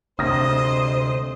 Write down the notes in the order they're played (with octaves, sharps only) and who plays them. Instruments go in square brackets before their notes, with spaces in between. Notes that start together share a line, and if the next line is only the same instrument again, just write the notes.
[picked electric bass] D2 C3 [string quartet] C5 D#5 [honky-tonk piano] D#6 A#6